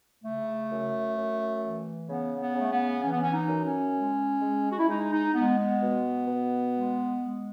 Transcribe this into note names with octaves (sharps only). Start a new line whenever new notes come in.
C#3 A3
F#2
F#2
E3
C#3 B3
B3
C#3 A3
B3
E3 C#4
B3
C#4
D#4
F#2
C#4
G#3
G#3
F#4
E4
G#3 D#4
D#4
G#3 B3
B3
B2
B2
G#3
G#3